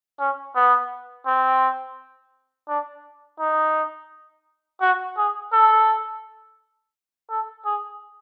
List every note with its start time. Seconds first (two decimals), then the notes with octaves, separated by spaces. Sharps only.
0.20 C#4
0.56 B3
1.27 C4
2.68 D4
3.40 D#4
4.81 F#4
5.17 G#4
5.52 A4
7.30 A4
7.65 G#4